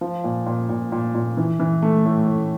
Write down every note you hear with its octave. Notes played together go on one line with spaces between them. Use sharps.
F3
A#2
A#2
A#2
A#2
A#2
E3
E3
A3
A2
A2